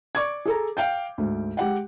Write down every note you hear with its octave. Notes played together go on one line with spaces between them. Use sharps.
D5 C#6 D6 G#6
G#4 A4 A#5
F5 G5 G6
D2 G#2
G#3 G4 F#5 G5